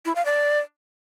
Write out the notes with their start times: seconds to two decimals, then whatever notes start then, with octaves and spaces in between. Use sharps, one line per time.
0.05 E4
0.15 F5
0.25 D5